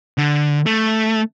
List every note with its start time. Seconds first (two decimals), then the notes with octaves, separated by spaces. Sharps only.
0.18 D3
0.66 A3